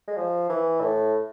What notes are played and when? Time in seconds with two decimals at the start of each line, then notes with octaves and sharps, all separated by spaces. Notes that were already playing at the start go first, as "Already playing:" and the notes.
0.08 G#3
0.17 F3
0.50 E3
0.81 A2